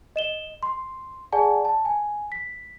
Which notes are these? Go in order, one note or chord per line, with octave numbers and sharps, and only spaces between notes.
D#5 E7 G7
C6
G#4 D5 F#5 G#5 A5
A5
G#5
B6